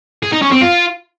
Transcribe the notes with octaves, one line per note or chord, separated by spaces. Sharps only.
G#4
D#4
C#4
C4
F4